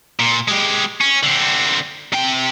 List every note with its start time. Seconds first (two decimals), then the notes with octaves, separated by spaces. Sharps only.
0.20 A#2
0.48 G#3 G4
1.01 C#4
1.23 D3 C4
2.13 C3 G5